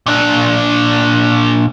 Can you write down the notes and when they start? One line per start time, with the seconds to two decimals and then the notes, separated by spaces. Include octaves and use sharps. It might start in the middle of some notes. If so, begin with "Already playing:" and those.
0.06 A#2 D4